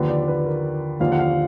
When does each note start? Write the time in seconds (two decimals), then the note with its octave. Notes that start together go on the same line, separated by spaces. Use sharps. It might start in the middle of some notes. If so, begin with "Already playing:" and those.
Already playing: D#2 D3 F3 B4
0.09 D5
0.28 B4
0.46 A#4
1.00 D#2 D3 F3 F5
1.12 F#5
1.19 F5